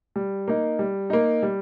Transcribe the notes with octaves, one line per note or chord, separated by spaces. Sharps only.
G3
A#3 D#4
G3
A#3 D#4
G3